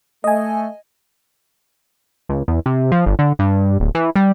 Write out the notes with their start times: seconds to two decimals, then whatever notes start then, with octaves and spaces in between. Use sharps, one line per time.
0.24 A3 D#5 G#5
2.29 C#2
2.48 E2
2.66 C3
2.92 F3
3.06 G1
3.19 D3
3.39 G2
3.80 D1
3.95 E3
4.16 G3